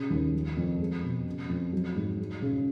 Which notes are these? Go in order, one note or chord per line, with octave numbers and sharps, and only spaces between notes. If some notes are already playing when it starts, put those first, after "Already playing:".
Already playing: C#3
D#2
F3
F2
G#3
B2
C#3
F2
F#3
G#2
G#3
C#3